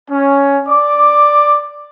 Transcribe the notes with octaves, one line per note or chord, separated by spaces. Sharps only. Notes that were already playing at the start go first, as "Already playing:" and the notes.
C#4
D5 D6